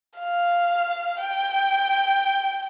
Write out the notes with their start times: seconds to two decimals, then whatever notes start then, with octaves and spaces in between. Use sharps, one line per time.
0.19 F5
1.22 G5